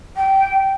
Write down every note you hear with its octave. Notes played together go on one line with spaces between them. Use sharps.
G5